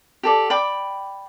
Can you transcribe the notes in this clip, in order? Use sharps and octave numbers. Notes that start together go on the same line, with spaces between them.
G4 A4 D5
D5 G5 B5 D6